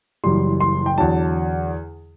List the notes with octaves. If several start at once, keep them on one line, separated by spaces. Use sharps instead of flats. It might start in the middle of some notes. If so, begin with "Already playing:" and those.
F#1 F#2 E3 G3 C6
C6
G5
E2 D3 F#3 A5